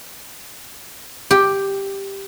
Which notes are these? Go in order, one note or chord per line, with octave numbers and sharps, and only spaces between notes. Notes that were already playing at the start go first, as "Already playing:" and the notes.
G4